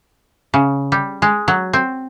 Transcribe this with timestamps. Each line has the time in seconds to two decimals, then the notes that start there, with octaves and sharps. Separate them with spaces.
0.54 C#3
0.92 G3
1.22 G#3
1.48 F#3
1.73 C4